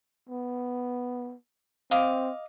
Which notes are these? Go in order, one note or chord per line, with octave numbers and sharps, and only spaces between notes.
B3
C4 D#5 F5 D6